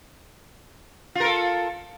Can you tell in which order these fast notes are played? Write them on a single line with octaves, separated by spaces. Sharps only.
F4 A#4 A4